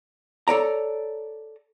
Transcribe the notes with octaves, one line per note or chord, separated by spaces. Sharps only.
A4 C#5 D5 A#5